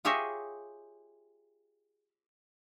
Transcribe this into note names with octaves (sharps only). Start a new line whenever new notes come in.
F4 G4 G#4 C#5 D#5 E5